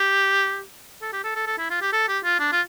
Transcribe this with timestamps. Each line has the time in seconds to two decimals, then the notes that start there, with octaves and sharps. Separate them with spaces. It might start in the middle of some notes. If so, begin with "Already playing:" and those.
Already playing: G4
1.02 A4
1.13 G4
1.24 A4
1.36 A4
1.47 A4
1.58 E4
1.70 F4
1.82 G4
1.92 A4
2.08 G4
2.24 F4
2.39 D4
2.52 F4